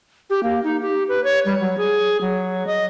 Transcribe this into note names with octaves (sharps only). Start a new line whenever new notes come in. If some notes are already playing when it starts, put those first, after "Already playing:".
G4
A#3
D#4
G4
B4
C#5
G3
F#3
G#4
F#3
D#5